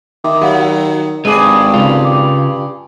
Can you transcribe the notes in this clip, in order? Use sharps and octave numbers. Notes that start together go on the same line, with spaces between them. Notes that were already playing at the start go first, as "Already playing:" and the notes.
D#3 E5 C6 D6
F#3 G4 F5 F#5
G#1 G2 G#3 G#4 D6 D#7
C#3 F4
D6